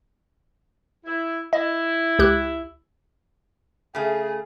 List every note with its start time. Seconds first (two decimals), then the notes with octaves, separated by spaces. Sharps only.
1.06 E4
1.53 E4 D#5
2.19 C#2 G4 F#6
3.95 C#3 A3 G#4